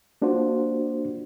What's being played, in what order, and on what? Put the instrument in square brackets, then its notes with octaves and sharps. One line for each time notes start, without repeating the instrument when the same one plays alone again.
[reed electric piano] A#3 D4 F4 F#4 C5